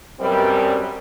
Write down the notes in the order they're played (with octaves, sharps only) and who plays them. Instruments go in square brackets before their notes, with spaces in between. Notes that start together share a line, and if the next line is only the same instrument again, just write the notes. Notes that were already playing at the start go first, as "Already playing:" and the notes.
[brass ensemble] F#2 B2 G3 C4